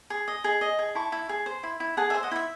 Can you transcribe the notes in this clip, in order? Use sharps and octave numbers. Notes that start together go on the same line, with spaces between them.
G#4
D#5
G#4
D#5
G#4
E4 A5 C#6
E4
G#4
C5
E4
E4
G#4 F#5 A5
E5 G#5
C5
D#5 F#5
E4 E5